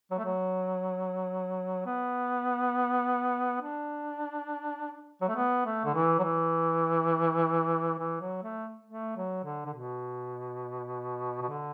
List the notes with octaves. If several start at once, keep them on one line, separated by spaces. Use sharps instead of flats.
F#3
A3
F#3
B3
D4
F#3
A3
B3
A3
D3
E3
F#3
E3
E3
F#3
A3
A3
F#3
D3
D3
B2
B2
D3